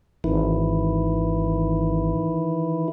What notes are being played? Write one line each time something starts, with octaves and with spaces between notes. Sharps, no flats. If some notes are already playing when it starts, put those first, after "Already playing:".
G#1 D#3 E3 E4